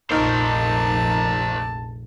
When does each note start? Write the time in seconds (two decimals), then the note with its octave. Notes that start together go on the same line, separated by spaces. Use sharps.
0.11 F1 A#1 A#2 D#4 A#4 C5 A5 F6